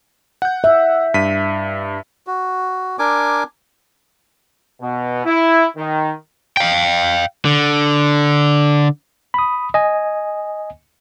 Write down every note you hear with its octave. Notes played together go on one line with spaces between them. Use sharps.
F#5 G6
E5
G2 B6 D#7
F#4
D4 A#4 G#5 D6
B2
E4
D#3
F5 G5
D3
B5 D#6
D#5 G#5